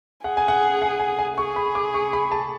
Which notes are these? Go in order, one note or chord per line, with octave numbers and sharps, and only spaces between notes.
G#4 F#5
G#5
F#5
F#5
G#5
G#5
G#4 C#6
B5
D6
C#6
B5
A5